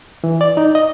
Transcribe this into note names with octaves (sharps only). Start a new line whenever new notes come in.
E3
D5
D#4
D#5